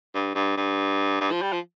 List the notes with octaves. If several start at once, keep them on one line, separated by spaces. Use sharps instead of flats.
G2
G2
G2
G2
F3
G3
F3